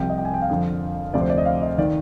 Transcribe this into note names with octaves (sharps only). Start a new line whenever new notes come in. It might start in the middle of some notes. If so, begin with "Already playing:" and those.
Already playing: C2 C3 F3 G5
D#5
G5
G#5
G5
F5
F2 D3 F3
D2 C3 F3 D5
C5
D5
D#5
F5
D#5
D#3 D5